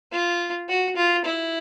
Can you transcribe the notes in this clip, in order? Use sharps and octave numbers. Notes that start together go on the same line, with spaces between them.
F4
F#4
F4
E4